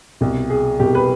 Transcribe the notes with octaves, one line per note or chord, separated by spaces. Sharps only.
C2 B2
G#4
C2 B2 G4
B4